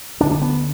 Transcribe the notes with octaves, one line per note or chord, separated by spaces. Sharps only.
D2 D3 D4
D4
B3